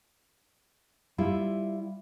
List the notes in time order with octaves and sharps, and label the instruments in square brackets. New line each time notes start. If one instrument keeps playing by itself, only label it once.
[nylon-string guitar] G3 E4 F4